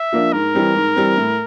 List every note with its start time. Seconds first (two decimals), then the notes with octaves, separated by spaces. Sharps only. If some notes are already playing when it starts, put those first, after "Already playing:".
Already playing: E5
0.12 F3 A#3 D4
0.33 G#2 A#4
0.54 E3 G3 C4
0.75 G#2
0.96 E3 G3 C4
1.17 A2